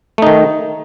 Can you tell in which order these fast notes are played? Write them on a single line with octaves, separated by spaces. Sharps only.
A3 D#4 D#3